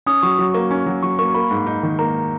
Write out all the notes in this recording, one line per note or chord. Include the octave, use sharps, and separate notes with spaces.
C#4 D#6
F#3 C#6
F#3
A#3
C#4
F#3
F#3 C#6
A#3 C#6
A#3 B5
G#2
D#4
D#3
A#3 A#5